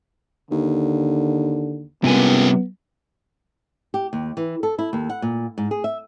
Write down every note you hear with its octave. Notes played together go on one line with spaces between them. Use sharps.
D#2 D3
C#2 G2 C3 B3 A#4 G#5
G4
D#2
E3
A4
E4
D#2
F#5
A#2
G#2
G#4
E5